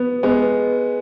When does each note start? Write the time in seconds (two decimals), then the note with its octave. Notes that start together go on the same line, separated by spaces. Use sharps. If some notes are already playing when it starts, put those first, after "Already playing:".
Already playing: B3
0.23 G#3 B3